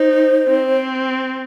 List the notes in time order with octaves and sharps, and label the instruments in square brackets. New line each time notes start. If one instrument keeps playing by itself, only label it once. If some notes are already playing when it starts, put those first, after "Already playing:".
Already playing: [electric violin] D#4 [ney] C5
[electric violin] C4